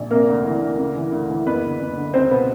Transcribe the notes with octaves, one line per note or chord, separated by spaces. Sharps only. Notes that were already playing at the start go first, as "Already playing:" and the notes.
Already playing: A#1
C3 A#3 A#4
D2
E3
D2
C#3
E3
D2
E3
F#1 B3 B4
D3
F#1
D3
C#2 C4 C5
B2 B3 B4